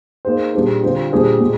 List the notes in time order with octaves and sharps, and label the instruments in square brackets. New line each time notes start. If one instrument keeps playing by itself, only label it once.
[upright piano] A#3 D#4 G#4 C5
A#2 G3 D4 G#4 C5
D3 G3 C4 F4 C5
A#2 G3 D4 G#4 C5
A#2 G#3